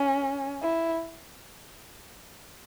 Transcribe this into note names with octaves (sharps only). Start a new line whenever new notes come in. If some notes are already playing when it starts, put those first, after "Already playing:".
Already playing: C#4
E4